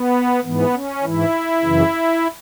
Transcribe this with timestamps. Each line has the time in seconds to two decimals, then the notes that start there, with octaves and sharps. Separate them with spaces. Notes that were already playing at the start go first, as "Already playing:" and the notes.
Already playing: B3
0.44 G#2 E3 B3
0.74 C#4
1.03 G#2 E3 E4
1.62 F#2 C#3 E3